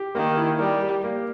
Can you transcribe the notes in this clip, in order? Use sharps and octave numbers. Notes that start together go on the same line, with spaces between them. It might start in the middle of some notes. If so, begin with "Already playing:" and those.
Already playing: G4
D#3 A#3
E4
G3 A#4
G4
A#3